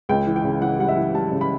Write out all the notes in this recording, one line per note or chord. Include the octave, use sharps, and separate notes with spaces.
C#2 G5
E3
G5
C#3
E3 F#5
G3 F#5
E5
E3
G3 A5
C#3
B5